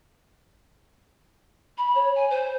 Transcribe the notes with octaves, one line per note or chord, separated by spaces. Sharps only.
B5
C#5
G#5
C5